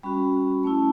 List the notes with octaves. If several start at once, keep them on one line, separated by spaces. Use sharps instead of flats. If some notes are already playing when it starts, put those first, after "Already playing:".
G3 C#4 F#4 B5
A3 C#4 E4 A5